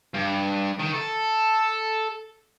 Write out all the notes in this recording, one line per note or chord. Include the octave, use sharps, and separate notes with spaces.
G2
D#3
A4